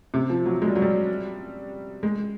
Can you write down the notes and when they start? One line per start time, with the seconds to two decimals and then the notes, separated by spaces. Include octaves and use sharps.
0.14 C3
0.30 F3
0.46 F#3
0.62 G#3
0.68 G3
0.75 F#3
0.82 G3
2.03 G#3